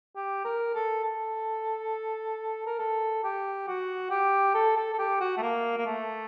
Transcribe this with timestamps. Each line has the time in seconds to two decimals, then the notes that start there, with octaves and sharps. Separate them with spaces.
0.16 G4
0.45 A#4
0.75 A4
1.04 A4
2.67 A#4
2.79 A4
3.24 G4
3.68 F#4
4.11 G4
4.54 A4
4.77 A4
4.93 A4
4.99 G4
5.20 F#4
5.37 A3
5.42 A#3
5.77 A#3
5.86 A3